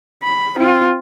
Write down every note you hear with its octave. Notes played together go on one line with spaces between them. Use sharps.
B5
C4 F4